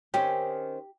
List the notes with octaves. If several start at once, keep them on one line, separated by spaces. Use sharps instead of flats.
D#3 C4 C#4 G4